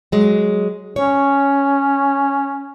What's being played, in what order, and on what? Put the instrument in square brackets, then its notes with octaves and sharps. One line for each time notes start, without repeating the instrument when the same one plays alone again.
[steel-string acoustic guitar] F#3 G#3
[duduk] C#4 [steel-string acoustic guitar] C#5